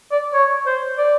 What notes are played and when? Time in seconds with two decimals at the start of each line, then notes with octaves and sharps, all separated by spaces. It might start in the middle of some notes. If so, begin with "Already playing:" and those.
0.12 D5
0.34 C#5
0.66 C5
0.98 D5